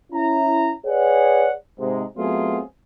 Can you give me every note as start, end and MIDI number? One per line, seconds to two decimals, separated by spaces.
0.12 0.72 61
0.12 0.72 64
0.12 0.72 82
0.86 1.51 68
0.86 1.51 71
0.86 1.51 73
0.86 1.51 74
0.86 1.51 78
1.80 2.04 44
1.80 2.04 48
1.80 2.04 56
2.18 2.61 54
2.18 2.61 57
2.18 2.61 59
2.18 2.61 60
2.18 2.61 65
2.18 2.61 68